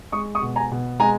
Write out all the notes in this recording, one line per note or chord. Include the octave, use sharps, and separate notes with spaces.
G#3 C#6 D#6
C#6 D#6
B2
G#5 A#5
B2
G#3 G#5 A#5